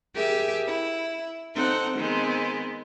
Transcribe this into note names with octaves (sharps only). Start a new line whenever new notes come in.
G4 G#4 A#4 E5
E4
C4 D#4 A4 F#5
D#3 G#3 B3 C4